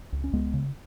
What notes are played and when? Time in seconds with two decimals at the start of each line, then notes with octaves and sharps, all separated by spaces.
0.12 C#2
0.24 C#4
0.33 C#2 G#3 B3
0.54 C#3